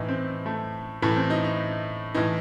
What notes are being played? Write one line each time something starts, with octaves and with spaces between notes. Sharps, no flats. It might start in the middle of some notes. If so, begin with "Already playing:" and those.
Already playing: A2 E3 D#4
C4
A3
A2 E3 A3
C4
D#4
D#4
A2 E3 D#4